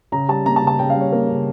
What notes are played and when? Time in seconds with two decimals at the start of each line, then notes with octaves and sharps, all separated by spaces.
0.12 C#3 A#5
0.28 G3 A5
0.46 A#3 A#5
0.56 A5
0.62 C#3
0.67 A5
0.79 C#3 G5
0.90 F5
0.95 G3
1.01 C#5
1.12 A#3 A#4
1.29 C#3